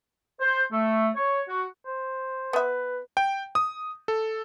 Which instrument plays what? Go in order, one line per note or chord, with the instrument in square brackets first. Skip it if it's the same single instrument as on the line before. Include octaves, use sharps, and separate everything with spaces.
[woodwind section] C5
A3
C#5
F#4
[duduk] C5
[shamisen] B3 E5 [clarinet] B4
[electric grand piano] G5
D#6
A4